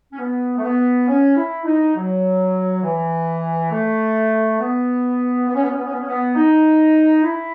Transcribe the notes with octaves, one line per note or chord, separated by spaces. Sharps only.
C#4
B3
A3
B3
C#4
E4
D#4
F#3
E3
A3
B3
B3
C#4
B3
C#4
B3
C#4
B3
C#4
B3
D#4
E4